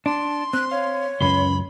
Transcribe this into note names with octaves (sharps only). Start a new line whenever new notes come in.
D4 A5 C6
C4 F#6
C#5 F5
C#2 F#2 C#4 B4 B5 C6